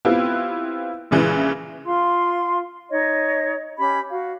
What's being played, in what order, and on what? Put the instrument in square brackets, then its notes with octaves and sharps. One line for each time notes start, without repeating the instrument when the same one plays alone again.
[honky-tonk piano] B3 C4 E4 F4 G4 B4
A#1 C#3 E3 G#3
[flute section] F4 F5 C6
D#4 C#5 D#5
C#4 G4 B5
F#4 F5